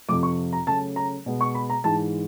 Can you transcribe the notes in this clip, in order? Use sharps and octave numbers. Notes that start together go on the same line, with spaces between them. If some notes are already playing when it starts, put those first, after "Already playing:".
F2 C3 F3 D6
C#6
A#5
C#3 F#3 A3 A5
A#5
B2 G#3 B3
C#6
B5
A#5
G#2 E3 G#3 A5